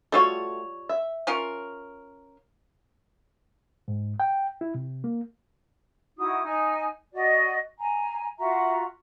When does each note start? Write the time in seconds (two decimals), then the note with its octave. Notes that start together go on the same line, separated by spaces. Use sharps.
0.12 G3 A3 F4 F#4 A4 C#5
0.89 E5
1.27 C#4 F4 A#4
3.88 G#2
4.20 G5
4.61 E4
4.75 C3
5.04 A#3
6.17 D#4 E4 F#4 D#6
6.44 D#4 G#5
7.13 F#4 D5 D#5
7.78 G#5 A#5
8.38 F4 F#4 E5 A#5